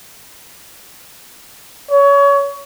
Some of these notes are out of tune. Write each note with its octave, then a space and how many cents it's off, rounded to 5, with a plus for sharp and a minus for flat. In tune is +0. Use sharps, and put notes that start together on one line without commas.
C#5 +25